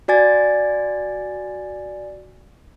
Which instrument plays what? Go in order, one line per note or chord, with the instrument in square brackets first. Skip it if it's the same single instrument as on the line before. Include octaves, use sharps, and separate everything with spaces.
[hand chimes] F#4 D5 G#5 A6